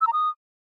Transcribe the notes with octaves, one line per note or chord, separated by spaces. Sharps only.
E6
A#5
D#6